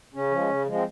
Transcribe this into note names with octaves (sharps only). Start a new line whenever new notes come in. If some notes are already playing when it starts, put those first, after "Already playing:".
C#3 C#4
F3
G#3
C#3
F3 G#3
C4